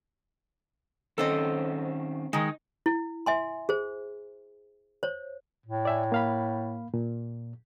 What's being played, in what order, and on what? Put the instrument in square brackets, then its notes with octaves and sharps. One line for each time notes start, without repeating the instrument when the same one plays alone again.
[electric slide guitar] D#3 C4 C#4 [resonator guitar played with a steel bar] A4 C5 D#5
[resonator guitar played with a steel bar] D#3 G#3 [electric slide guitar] D#4
[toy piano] E4
E5 G#5 C6
G#4 C5
C5 C#5
[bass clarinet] A2
[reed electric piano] D5 E5 G#5
A#3 F5 B5
A#2